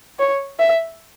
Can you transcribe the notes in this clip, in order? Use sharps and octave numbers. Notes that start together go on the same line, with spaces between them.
C#5
E5